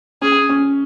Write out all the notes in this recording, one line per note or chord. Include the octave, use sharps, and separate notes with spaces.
C#4 G#4
C#4